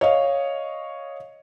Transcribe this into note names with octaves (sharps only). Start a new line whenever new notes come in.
C#5 D#5 F5